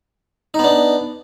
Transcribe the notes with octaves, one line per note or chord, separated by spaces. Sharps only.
B3 D4 D#4